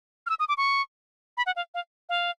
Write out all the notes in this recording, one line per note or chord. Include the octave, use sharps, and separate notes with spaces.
F6
E6
D#6
D6
C#6
B5
F#5
F5
F5
F5